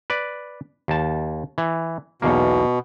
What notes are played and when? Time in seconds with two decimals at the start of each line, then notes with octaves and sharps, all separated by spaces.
0.10 B4 D5
0.88 D#2 A5
1.58 E3
2.22 B1 E2 B2 A#3